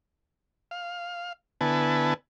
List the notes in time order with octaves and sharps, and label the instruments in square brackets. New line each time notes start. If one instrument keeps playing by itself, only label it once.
[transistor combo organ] F5
D3 B3 E4 B4 G#5 A5